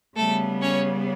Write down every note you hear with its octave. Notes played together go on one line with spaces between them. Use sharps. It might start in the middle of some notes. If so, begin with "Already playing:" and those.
C#3 G3 A3 B3 A4
C#4 C#5